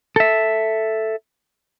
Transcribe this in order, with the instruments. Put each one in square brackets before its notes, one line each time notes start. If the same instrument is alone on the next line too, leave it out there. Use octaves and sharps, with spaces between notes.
[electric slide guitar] A4 E5